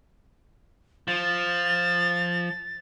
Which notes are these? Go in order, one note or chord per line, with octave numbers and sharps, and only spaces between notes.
F3 A6